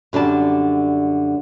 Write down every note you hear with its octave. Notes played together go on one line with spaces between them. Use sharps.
F#2 D3 G3 A5